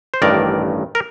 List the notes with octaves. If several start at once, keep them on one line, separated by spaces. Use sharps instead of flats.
C5
A1 G2 D#3 A#4 D5
A#4